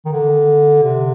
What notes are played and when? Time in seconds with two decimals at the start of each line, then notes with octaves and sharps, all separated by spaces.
0.05 D#3
0.12 D3
0.82 C3